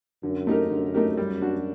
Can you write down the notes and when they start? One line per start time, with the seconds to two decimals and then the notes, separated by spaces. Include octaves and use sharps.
0.23 F#2 D3
0.47 A3 D#4 G4 A#4
0.71 F#2 D3
0.94 A3 D#4 G4 A#4
1.17 G3
1.42 D4 F#4